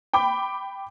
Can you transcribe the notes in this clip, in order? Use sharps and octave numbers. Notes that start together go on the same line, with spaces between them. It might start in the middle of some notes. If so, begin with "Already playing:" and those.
G5 B5 D6